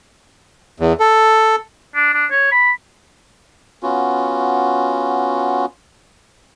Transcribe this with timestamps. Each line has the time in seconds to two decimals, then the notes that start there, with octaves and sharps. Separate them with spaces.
0.80 E2
1.00 A4
1.95 D4
2.14 D4
2.31 C#5
2.52 B5
3.83 B3 C#4 F4 F#4